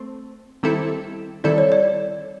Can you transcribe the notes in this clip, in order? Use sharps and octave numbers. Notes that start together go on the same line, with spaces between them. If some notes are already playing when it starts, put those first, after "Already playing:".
Already playing: A3 C4
D#3 G3 C4 E4 A4
D#3 G3 C4 E4 A4 D5
C#5
D5